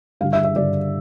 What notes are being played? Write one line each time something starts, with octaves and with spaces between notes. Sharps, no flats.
G2 D3 G3 F5
E5
E5
G2 D3 G3 D5